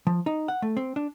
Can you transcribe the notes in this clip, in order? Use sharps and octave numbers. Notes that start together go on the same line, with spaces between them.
F3
D#4
F#5
A3
C4
D4